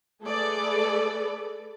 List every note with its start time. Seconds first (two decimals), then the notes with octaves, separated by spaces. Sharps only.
0.22 A3 G#4 A4 B4 D5